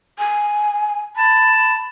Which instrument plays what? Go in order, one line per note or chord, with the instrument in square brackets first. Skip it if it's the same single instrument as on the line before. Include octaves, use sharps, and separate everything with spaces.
[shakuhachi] G#5
[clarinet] A5 [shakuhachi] B5